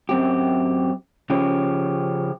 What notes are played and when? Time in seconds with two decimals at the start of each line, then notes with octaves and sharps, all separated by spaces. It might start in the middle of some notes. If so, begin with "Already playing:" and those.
0.09 F#2 C4 G4
1.30 C#3 F3 C#4 G4